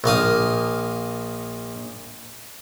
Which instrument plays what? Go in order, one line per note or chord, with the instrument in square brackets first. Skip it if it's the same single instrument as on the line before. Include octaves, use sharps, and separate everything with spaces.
[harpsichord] A#1 A#3 F5 D#6